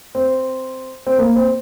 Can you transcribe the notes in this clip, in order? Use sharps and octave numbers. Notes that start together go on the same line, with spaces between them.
C4
C4
A#3
C4